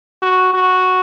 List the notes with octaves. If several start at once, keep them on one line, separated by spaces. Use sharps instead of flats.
F#4
F#4